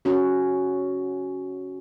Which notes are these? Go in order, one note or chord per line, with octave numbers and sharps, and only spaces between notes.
C#4 F#4